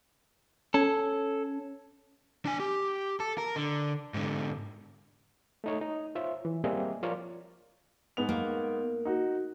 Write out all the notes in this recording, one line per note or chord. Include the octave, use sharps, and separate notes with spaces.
C#4 A4
D4 G#5
G4
A4
A#4
D3
G#2 D3
A3 D#4 C#5
D#4
F4 C5 C#5 E5
E3
G3 A#3 C4 G#4 D#5 E5
F3 F4 A#4 C#5 D5
G#2 B3 F7
A#3
D#4 F#4